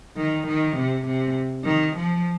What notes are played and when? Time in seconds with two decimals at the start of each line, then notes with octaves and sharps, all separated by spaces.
0.17 D#3
0.46 D#3
0.76 C3
1.05 C3
1.64 D#3
1.94 F3